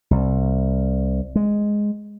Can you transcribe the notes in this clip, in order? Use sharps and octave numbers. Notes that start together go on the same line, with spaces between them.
C2
G#3